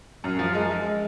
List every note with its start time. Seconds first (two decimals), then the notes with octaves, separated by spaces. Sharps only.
0.24 F#2
0.39 F3
0.55 G#3
0.71 G#3